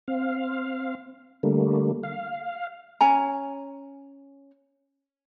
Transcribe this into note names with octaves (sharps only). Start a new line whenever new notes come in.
C4 F5
D3 G3 A3 A#3
F5
C#4 G#5 A#5